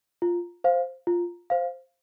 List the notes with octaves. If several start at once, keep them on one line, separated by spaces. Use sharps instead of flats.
F4
C5 F5
F4
C5 F5